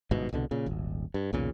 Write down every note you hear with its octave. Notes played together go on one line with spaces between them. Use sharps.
G1 G#2 B2
C2 B2 D3
A#2 C#3
D#1 G#1
G2
B1 E2 A#2 C#3